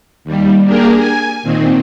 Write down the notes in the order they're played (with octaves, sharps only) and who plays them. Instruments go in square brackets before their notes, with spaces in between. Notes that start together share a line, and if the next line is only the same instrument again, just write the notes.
[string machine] D#2 G3
A#3 D4 G4 G#4 A#4
G#5
A#2 D#3 C4